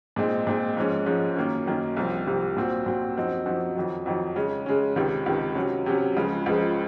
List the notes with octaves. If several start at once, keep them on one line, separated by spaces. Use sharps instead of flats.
A#2 G#3 C4 D#4
A#2 G#3 C4 D#4
G#2 F3 G#3 C#4
G#2 F3 G#3 C#4
F#2 D#3 A#3 C#4
F#2 D#3 A#3 C#4
C2 C3 F3 C4
C2 C3 F3 C4
A#2 F#3 C4 F#4
A#2 F#3 C4 F#4
F#2 F3 C4 D#4 F#4
F#2 F3 C4 D#4 F#4
F2 D#3 F#3
F2 D#3 F#3
C#3 G#3 C#4
C#3 G#3 C#4
C#2 C3 D#3
C#2 C3 D#3
C3 F#3 C#4
C3 F#3 C#4
C#2 C#3 F3 G#3
C#2 C#3 F3 G#3